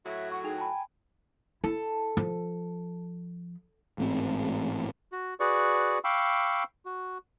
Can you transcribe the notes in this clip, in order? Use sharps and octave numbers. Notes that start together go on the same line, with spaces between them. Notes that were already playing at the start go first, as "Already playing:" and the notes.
A2 F#3 F#4 E5
F#5 C#6
D#4 G#4 G5 F7
G#5 A5 B5
E4 A4
F3
A1 G#2 C4
F#4
F#4 G#4 B4 D5 C#6
F5 G5 B5 C#6 D6 E6
F#4